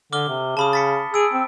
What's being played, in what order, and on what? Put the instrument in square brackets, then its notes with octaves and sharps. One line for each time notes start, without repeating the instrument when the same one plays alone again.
[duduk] D3 [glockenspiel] D6 F6 G7
[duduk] C3
[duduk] C#3 [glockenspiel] A5 B5 D#6
[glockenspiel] A6 B6 C#7
[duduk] G#4 [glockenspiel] E6 D7
[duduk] C4